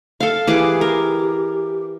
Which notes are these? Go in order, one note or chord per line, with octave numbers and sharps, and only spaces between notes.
A4 F5
E3 G4 G#4 D6
A#4